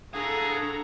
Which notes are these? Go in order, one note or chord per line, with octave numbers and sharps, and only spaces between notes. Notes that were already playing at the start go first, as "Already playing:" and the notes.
D4 G#4 A4 F5 F#5 A#5